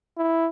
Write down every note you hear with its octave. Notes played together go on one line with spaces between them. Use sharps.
E4